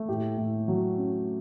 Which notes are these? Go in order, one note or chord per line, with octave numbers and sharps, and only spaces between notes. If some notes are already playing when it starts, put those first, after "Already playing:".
Already playing: A3
A2 G4
A2
F#3
C#4